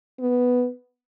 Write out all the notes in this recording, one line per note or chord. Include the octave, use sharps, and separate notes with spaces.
B3